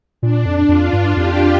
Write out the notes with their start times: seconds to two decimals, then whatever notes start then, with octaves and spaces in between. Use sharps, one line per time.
0.22 A#2 D4
0.46 F2
0.69 F2 F4
0.93 G2
1.16 F2 G4